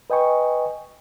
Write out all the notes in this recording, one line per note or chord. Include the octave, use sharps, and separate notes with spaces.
B4 D#5 G5 G#5 C#6